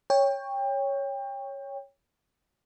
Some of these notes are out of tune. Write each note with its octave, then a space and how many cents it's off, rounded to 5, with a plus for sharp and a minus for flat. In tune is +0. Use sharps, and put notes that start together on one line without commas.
C#5 +0 G5 +25